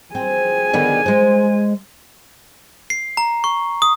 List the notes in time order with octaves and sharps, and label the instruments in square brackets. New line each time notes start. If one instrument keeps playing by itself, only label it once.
[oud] C4 [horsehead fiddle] G#4 G#5
[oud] D3 D#3 B3
G#3 C5
[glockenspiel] C7
A#5
C#6
D#6